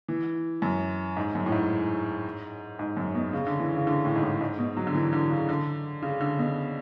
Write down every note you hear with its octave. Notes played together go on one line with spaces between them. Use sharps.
E3
F#2
G#2
F#2
A2
G#2
G#2
F#2
B2
C#3
D3
E3
C#3
D3
A2
G#2
A2
G#2
B2
F#3
D3
E3
D3
C#3
D3
C#3
D3
B2